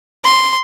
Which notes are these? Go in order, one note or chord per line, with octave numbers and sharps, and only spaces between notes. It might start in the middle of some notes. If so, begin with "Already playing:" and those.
C6